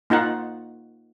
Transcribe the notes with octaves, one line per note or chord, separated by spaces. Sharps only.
A#3 D#4 F4 F#5